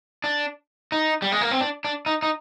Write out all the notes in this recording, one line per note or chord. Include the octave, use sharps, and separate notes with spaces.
D4
D#4
G3
G#3
A#3
C4
D4
D4
D#4
D#4